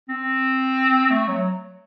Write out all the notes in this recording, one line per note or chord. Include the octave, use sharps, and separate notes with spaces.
C4
A3
F#3